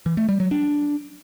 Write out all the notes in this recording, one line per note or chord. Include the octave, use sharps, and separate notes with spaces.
E3
A3
G3
F#3
D4